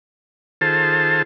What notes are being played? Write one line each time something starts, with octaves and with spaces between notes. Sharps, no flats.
D#3 F4 G#4 A4 C5 A5